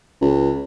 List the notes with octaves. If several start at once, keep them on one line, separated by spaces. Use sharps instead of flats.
C#2